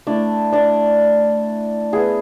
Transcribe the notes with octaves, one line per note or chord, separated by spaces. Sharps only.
A3 D4 E4 D5
D4 D5
B3 E4 G#4